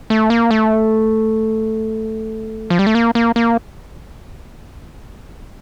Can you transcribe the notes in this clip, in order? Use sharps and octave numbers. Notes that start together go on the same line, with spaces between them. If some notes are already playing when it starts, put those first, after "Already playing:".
A3
A#3
A3
F3
G3
A3
A#3
A#3
A#3